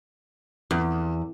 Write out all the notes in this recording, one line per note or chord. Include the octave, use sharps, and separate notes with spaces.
E2